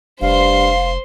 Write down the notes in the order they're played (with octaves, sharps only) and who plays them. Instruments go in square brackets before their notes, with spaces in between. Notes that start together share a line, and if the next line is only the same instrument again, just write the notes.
[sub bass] F1 [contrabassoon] G2 [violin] C5 C6 [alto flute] F5